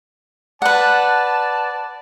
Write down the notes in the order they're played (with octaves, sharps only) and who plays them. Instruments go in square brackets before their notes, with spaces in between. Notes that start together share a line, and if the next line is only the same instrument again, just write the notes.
[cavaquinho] B4 F#5 [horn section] D5 A5